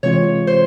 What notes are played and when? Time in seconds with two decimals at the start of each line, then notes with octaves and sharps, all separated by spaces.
0.03 C3 E3 G#3 C4 F4 C#5
0.47 C5